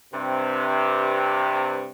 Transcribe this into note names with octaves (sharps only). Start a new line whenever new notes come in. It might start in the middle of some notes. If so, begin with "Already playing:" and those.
G2 C3